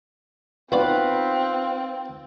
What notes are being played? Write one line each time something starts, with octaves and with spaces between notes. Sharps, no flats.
B3 C4 D#4 F4 F#4 B4 D5